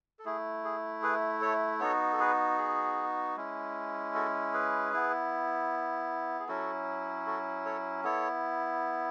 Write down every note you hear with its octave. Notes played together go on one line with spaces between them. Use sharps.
A4
A3 E4 G#4
G#4
G#4 B4
A4 C#5
B3 D#4 F#4 A4 C#5
A4
G#4 B4
G#4
G#3 C#4 E4
F#4 A4
G#4 B4
B3 E4
G#4
F#3 C#4 E4 F#4 A4
F#4 A4
A4 C#5
B3 E4 A4 C#5